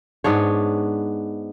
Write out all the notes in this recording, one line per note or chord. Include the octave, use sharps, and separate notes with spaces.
G#2 B3 D4 C#5